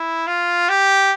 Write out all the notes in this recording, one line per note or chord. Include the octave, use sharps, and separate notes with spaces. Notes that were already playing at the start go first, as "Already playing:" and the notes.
Already playing: E4
F4
G4